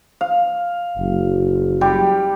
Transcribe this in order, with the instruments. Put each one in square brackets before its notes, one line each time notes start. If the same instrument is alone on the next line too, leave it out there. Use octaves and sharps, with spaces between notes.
[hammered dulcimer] F5
[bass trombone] F#1
[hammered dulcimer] G3 G4